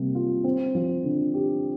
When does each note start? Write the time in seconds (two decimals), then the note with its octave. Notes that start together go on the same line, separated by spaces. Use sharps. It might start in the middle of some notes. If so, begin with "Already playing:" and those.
Already playing: C3 G3 A#3
0.15 F4
0.44 C4
0.75 F3
1.04 D3
1.34 G4